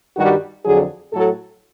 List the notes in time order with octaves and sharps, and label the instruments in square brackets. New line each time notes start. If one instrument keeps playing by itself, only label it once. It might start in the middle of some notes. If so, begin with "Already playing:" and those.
[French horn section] G2 D#3 G3 F#4
F2 D3 F#3 G#4
A2 F#3 A4